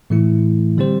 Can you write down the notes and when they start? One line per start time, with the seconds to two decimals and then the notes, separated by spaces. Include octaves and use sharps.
0.10 A2 E3 A3 E4
0.77 D3 G3 C4 G4 C5